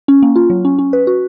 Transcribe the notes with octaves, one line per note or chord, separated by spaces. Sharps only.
C#4
A#3
F4
F#3
C#4
C#4
B4
F#4